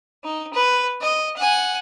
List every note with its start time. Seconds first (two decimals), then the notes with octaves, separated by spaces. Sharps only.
0.24 D#4
0.53 B4
1.01 D#5
1.36 F#5 G#5